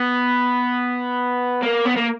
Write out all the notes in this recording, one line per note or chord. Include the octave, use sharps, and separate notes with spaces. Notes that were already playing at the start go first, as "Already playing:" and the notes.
Already playing: B3
A#3
B3
A#3